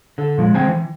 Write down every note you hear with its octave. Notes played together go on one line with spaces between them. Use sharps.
D3 A4
A#2 F3 G3 G#3
D3 G#3 C4 C5 G5 G#5
E3